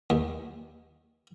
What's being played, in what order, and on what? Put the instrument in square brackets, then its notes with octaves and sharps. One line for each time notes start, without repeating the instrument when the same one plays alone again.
[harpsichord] D#2